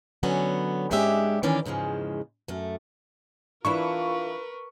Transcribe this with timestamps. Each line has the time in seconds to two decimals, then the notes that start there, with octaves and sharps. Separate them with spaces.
0.23 D3 F#3 B3 C#4
0.91 G#2 G#3 C#4 D4 G4 E5
1.43 D#3 E3 C#4 D4 D5
1.66 E2 G#2 C#3 F3 G#3
2.48 F#2 A3
3.65 E3 D4 E4 F4 A#4 B4 C#6